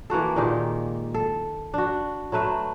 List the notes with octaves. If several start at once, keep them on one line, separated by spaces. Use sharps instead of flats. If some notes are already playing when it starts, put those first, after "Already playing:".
E3 A#3 F#4 A4
A#2 D#3 G#3 G4
A4
D4 F#4
F#3 A3 B4 E5